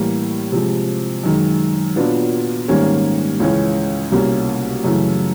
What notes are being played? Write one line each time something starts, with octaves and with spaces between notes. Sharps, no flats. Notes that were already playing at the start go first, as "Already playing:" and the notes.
Already playing: A2 E3 G3 A#3
C3 F3 G#3
F#2 D#3 G#3
A#2 F#3 B3 D4 F4
G#2 D#3 G3 A#3 C#4
C#2 C#3 E3 G#3 C#4
C2 B2 G3 A#3 C#4
F#2 C#3 E3 A3